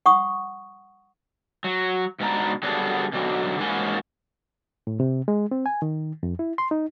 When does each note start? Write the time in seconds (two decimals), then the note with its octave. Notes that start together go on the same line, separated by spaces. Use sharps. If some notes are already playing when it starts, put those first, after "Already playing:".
0.06 F#5 C#6 D#6
1.64 F#3
2.20 G#2 B2 B3 D4 A#5
2.63 D3 F#3 G3 B3 G#4 A4
3.13 B2 D3 F#3
3.60 G#2 E3 A#3 C#4 F#4 G#5
4.87 A2
5.00 C3
5.28 G#3
5.51 C4
5.66 G#5
5.82 D#3
6.23 F2
6.39 E4
6.58 C6
6.71 D#4